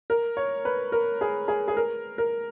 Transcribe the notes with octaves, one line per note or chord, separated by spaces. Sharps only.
A#4
C#5
B4
A#4
G#4
G#4
G#4
A#4
A#4